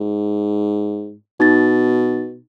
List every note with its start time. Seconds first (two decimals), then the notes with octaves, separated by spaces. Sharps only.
0.01 G#2
1.40 B2 D#4 A6